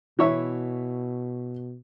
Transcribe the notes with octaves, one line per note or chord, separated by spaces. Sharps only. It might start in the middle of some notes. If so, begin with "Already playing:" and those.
B2 E3 C#5 E5